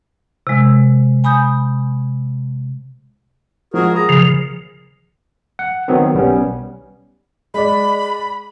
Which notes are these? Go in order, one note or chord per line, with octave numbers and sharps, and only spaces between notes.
C3 G#3
G#5 B5 D#6 G6
F3 G#3 F#4 G#4 A#4
G#4 A#5 B5 D#6 A#6
A#2 C#3 F3
F#5
D#3 F#3 B3 C4
B1 G3 B3 C#4
G#3 D5 B5